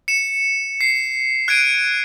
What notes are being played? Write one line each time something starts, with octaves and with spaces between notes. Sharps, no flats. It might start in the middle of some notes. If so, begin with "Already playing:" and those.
C#7 E7
C7
F#6 G#6 C7 D7 D#7